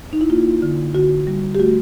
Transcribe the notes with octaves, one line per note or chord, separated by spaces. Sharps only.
D#4
E4
A#3 F4
D3
D3 F#4
G3
G4
A3 F#4